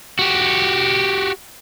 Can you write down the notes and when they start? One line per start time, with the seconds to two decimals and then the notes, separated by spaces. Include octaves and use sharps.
0.19 F#4 G4